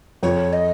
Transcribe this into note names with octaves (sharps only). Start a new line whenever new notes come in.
F2 C#5
D#5